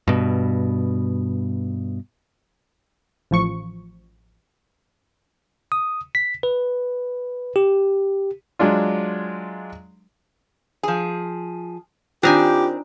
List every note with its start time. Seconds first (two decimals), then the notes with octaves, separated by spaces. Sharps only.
0.08 G2 B2
3.31 A1 F3 C#6 C#7
5.72 D#6
6.15 B6
6.43 B4
7.56 G4
8.59 F#3 G#3 D4 F4
10.83 F3 G#4
12.23 D#3 C4 D4 D#4 F4 G4 G#5